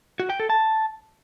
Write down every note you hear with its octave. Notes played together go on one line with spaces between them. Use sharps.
F#4
G5
A4
A5